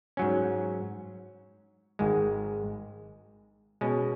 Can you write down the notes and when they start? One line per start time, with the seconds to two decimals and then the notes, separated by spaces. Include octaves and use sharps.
0.17 G#2 F#3 C#4
1.99 G#1 G#2 G#3
3.81 B2 G#3 C#4